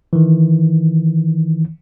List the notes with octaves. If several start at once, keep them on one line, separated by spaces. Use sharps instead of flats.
D#3 E3